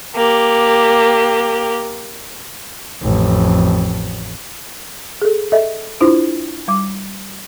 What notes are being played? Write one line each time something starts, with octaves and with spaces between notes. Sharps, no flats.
A#3 G4
A1 F2
G#4 A4
A4 D#5 E5
D4 E4 F4 C5
G3 D6